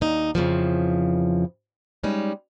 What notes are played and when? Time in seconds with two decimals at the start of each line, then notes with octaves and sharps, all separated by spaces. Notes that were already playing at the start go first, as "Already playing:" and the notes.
0.01 D#2 D#4
0.35 F2 C#3 E3 F3
2.03 G3 G#3 C#4 D#4